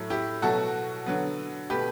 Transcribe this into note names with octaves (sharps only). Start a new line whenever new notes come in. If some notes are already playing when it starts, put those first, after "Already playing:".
Already playing: A2 F#3 A3 E4
E4 G4
B2 F#3 A3 F#4 A4
D3 F#3 B3
B2 A3 G4 B4